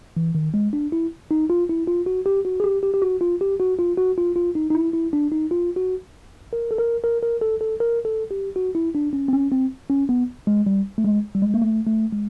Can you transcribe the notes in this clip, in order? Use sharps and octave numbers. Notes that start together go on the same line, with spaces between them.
E3
D#3
G#3
D4
E4
D#4
F4
E4
F4
F#4
G4
F#4
G#4
G4
G4
G4
F#4
F4
G4
F#4
F4
F#4
F4
F4
D#4
D#4
E4
E4
D4
D#4
F4
F#4
A#4
A4
A#4
A#4
A#4
A4
A4
A#4
A4
G4
F#4
E4
D4
C#4
C4
C#4
C4
C#4
B3
G#3
G3
A3
G#3
G3
G#3
A#3
A3
A3
G#3